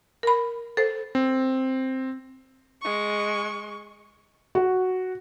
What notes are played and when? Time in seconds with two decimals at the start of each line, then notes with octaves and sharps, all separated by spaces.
0.23 A#4 B5
0.77 A4 C5
1.15 C4
2.82 G#3 C#6
4.55 F#4